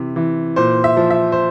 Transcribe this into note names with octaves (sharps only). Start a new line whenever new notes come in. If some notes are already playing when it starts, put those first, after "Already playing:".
Already playing: C3 E3
E3
A#2 C5
E5
F3
E5
C5